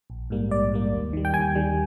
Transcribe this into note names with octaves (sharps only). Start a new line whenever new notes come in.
A#1
G#2 G3 A#3
A#1 D5
G#2 G3 A#3
D#2
D#3 G3
G5
D#2 G#5
D#3 G3